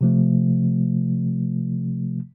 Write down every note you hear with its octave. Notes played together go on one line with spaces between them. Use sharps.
C3 F3 A3